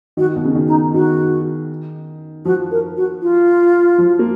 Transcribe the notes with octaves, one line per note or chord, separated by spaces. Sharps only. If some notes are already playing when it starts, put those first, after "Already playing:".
D#3 F#4
B2
C#3
D#3
D#4
D#3 F#4
F3 F#4
A#4
F#4
F4
F3
A#3